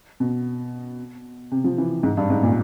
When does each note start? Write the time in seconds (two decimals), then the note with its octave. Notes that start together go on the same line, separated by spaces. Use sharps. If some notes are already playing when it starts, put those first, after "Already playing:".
0.20 B2
1.51 C3
1.64 F3
1.78 E3
2.03 G#2
2.17 G2
2.30 G#2
2.43 A#2